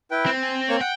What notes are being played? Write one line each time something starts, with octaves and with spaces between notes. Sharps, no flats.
E4 B4 G5
C4
G#5
A#3 C#5 C#6
F#5 G5